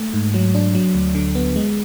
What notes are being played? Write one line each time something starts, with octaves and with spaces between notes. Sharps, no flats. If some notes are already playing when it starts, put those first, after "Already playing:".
Already playing: A3
G#2
F#3
D4
F#3
D2
D3
B3
G#3